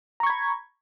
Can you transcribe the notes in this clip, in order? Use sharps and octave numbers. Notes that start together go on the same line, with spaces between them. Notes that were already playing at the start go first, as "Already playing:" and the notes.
A#5 B5 C#6 G#6